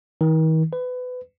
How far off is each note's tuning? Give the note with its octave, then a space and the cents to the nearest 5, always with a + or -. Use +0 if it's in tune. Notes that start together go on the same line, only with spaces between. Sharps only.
D#3 +40
B4 +25